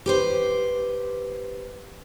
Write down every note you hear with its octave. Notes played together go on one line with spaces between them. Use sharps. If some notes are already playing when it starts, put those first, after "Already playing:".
G4 B4 C5